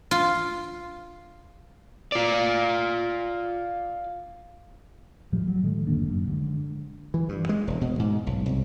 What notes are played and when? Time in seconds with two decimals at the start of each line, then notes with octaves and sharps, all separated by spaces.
0.11 F4
2.12 F4 D5
5.32 A2 F3 G3
5.48 F#3
5.63 A2 D#3 G#3 A3
5.87 F#1 D3 A#3 D4
6.08 F#2
6.28 D3 F#3 G#3
7.14 E3
7.29 G2
7.49 G#3
7.67 E1
7.81 B2
7.99 G#2
8.27 B1
8.46 C2